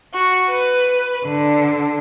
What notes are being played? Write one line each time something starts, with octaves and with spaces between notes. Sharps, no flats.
F#4
B4
D3